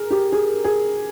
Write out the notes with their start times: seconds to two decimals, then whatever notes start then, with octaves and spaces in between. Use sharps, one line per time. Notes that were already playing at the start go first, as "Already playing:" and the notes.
Already playing: G#4 A#4
0.11 G4
0.32 G#4
0.64 G#4